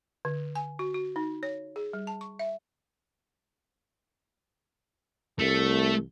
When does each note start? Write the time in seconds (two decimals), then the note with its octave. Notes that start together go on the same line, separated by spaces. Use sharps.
0.25 D3
0.55 G#5
0.79 F#4
0.94 F#4
1.16 D#4
1.43 C#5
1.76 G#4
1.93 G3
2.07 A5
2.21 C#6
2.39 E5
5.39 C2 A3